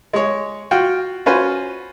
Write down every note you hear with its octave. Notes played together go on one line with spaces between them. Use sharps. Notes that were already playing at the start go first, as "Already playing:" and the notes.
G#3 C#5
F4 F#4 G5
C#4 F4 F#4 B4 C5 G#5